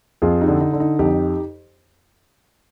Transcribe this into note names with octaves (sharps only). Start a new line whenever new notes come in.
F2 F4 G#4
D#4 G4
D3
D#4
D3
D#4
F2 D#4 G4